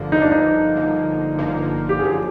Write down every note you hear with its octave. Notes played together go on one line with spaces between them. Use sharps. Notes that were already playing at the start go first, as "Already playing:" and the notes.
Already playing: G1 G2 D3 F3 A#3
G1 G2 D3 F3 A#3 D#4
D4
D#4
G1 G2 D3 F3 A#3
G1 G2 D3 F3 A#3
G4
F#2 D3 F3 G#4